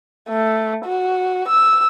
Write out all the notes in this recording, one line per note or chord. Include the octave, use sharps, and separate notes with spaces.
A3
F#4
E6